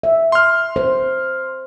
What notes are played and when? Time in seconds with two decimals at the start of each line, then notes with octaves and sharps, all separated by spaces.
0.03 E5
0.32 C6 F6
0.76 C5